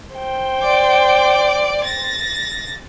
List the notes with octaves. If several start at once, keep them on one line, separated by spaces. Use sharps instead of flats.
C5 G5
D5 D6
A6 A#6